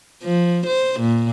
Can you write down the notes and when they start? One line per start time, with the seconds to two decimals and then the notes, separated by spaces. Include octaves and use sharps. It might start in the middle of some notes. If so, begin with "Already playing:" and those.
0.24 F3
0.66 C5
1.00 A#2